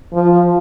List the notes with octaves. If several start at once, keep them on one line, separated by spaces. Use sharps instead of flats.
F3